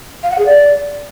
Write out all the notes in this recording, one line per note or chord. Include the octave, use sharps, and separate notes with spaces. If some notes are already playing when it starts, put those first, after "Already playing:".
F5
F#5
G#4
D5